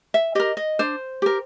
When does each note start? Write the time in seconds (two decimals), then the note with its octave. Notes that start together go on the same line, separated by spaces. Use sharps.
0.14 E5
0.35 G4 A#4 D#5
0.57 D#5
0.79 D4 C5
1.22 G4 A#4